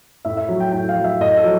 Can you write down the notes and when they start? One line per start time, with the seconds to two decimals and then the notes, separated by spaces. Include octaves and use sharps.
0.25 A2 E5
0.37 E5
0.49 F#3
0.60 G5
0.72 A2 G5
0.89 F5
0.96 F#3
1.04 E5
1.21 A2 D#5
1.37 A4
1.44 F#3